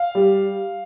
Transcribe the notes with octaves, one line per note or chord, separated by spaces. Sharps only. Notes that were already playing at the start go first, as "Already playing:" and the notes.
Already playing: F5
G3